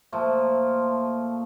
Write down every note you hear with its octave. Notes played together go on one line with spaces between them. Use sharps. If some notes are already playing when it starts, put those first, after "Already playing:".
A#2 F3 A3